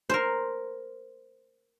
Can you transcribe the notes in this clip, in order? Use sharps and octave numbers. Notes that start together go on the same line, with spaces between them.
A#4 C5